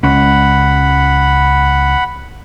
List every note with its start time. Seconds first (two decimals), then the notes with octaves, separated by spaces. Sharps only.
0.03 C#2 G#3 C#4 F#5 B5